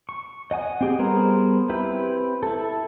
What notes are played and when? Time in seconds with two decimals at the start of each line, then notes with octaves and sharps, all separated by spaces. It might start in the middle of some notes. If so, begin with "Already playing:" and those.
0.09 C#6
0.51 D#5 F#5 G#5 D#6
0.81 C4 G4 G#4
0.99 G3 B3 G#4 A#4 C5
1.69 C4 E4 G4 B4
2.43 E4 A4